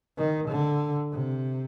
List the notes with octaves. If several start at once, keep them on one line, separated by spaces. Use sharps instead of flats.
D#3
D3
C3